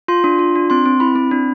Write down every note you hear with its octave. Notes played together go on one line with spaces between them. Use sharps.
F4 C6
D4
F4
D4
C4 C6
C4
E4 B5
C4
D4